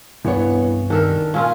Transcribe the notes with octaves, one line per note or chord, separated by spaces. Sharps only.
C2 G2 E3 B3 C#5
D#3 D4 A4 A#4
A#2 C#4 F4